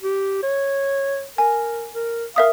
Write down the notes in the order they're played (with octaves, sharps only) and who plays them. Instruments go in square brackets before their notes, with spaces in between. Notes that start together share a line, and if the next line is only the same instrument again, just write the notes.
[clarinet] G4
C#5
[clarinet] A#4 [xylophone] G#5
[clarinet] A#4
[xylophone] A#4 E5 D#6 [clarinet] F5